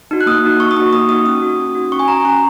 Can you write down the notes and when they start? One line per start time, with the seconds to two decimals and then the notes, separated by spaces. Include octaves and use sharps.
0.11 D#4 F#4
0.21 F#6
0.26 A#3 D#6
0.44 D#4 F#4
0.60 A#3 C#6
0.71 D#6
0.76 D#4 F#4 C#6
0.93 A#3 D#6
1.09 D#4 F#4 D#6
1.25 C#4 D#6
1.42 F#4
1.59 C#4
1.75 F#4
1.92 C#4 C#6
1.99 G#5
2.07 F#4 A#5
2.25 C#4 A#5